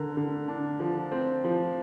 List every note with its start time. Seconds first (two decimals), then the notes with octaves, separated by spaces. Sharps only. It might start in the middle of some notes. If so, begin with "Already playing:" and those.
Already playing: D3 A#4
0.17 D3
0.48 D4
0.80 F3
1.12 C4
1.44 F3